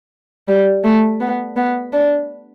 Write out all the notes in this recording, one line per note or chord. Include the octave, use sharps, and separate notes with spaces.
G3
A3
B3
B3
D4